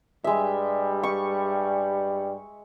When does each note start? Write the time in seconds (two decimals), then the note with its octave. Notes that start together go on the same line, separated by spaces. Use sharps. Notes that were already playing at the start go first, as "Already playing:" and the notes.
0.24 G2 G3 G#3 E5
1.03 C#6